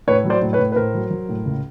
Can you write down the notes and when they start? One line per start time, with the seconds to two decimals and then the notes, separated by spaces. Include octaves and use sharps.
0.08 A2 B4 C#5
0.25 F#3
0.30 C5 D5
0.42 A2
0.53 B4 C#5
0.59 A2
0.72 B4
0.76 A2 A#4 C5
0.94 F#3
1.11 F#3
1.29 A2
1.46 C#2